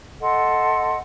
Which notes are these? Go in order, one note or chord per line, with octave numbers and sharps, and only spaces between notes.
A4 D#5 F#5 C6